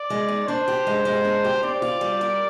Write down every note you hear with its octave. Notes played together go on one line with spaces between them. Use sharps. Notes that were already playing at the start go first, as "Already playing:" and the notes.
Already playing: D5
G#3
D#4
D4 C5
G4
G#3
G#3
D4
G4
C4 D5
F4
G3
A#4